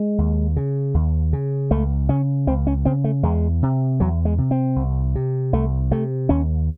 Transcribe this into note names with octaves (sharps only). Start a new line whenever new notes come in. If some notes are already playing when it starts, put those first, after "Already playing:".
Already playing: G#3
D#2
C#3
D#2
C#3
C#2 A3
C#3 C#4
C#2 C4
C#4
C#3 C4
A3
E2 G#3
C3
E2 F#3
G#3
C3
C4
C2
C3
C2 A3
C3 A3
D#2 C#4